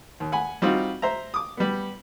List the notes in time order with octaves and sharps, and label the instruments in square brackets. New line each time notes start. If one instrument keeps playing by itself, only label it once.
[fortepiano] D#2
F#5 G#5 B5
G3 C4 D#4 F4 F#4
C5 E5 A#5
D6 D#6
G3 B3